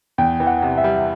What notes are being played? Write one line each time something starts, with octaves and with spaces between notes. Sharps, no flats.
E2 G5
E3
F#5
C3
E5
G3